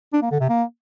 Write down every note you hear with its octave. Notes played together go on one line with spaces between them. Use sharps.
D4
A#3
D3
C3
A#3